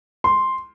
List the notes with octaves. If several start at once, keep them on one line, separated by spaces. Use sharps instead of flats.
C6